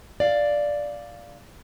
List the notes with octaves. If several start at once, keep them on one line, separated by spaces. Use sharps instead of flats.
D5 F5